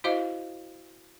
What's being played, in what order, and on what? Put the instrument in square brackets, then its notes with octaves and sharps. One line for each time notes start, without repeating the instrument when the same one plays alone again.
[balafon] E4 F#4 C5 D#5 F5 D6